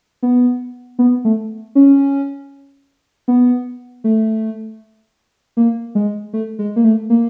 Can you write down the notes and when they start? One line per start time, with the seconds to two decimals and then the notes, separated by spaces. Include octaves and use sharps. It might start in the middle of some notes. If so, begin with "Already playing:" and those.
0.23 B3
0.99 B3
1.25 A3
1.75 C#4
3.28 B3
4.04 A3
5.57 A#3
5.95 G#3
6.33 A3
6.59 G#3
6.76 A#3
6.84 A3
7.10 A#3